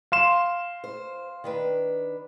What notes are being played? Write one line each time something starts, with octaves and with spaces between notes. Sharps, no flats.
F5 C6 E7
C5
D#3 D4 B4